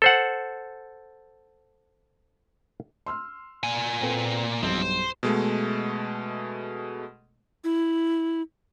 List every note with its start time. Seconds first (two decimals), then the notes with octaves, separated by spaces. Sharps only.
0.02 A4 C5 F#5
3.06 C6 E6 F6
3.63 A#2 G#5
4.01 C4 A4 B4
4.63 B1 G2 F3 C4 G4
4.82 C5
5.23 B2 G#3 A3
7.64 E4